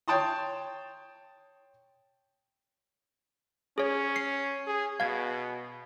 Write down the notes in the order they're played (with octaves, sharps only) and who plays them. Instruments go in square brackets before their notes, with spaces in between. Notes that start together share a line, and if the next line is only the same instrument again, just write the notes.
[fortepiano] C#5 G5 A5 C6 D#6
[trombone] C#4 [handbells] G#4 C#5
[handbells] C7
[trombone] G#4
[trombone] B2 [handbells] F5 G#6